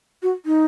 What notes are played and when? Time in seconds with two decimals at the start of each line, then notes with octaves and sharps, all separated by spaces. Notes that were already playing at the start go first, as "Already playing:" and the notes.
0.23 F#4
0.46 D#4